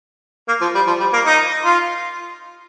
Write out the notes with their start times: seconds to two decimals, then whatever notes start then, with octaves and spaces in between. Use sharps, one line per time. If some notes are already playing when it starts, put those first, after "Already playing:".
0.48 A#3
0.61 F3
0.75 G3
0.87 F3
1.00 G3
1.13 A#3
1.26 D#4
1.65 F4